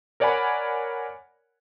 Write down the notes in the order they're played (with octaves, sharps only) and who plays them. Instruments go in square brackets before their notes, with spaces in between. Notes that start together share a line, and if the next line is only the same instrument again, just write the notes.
[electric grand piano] A#4 C#5 D5 F#5 G#5 B5